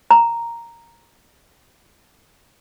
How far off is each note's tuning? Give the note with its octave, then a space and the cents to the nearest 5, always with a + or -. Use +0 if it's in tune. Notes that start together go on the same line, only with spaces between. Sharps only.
A#5 -5